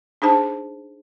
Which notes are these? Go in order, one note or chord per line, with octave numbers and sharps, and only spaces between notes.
D4 D#4 G#4 C5 A5